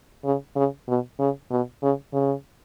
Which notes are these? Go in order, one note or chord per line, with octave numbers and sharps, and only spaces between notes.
C#3
C#3
B2
C#3
B2
C#3
C#3